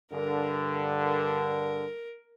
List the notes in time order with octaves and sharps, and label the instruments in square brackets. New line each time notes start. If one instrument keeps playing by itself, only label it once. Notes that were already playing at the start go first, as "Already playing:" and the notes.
[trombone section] G2 D3 [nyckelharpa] A#4
[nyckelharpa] A#4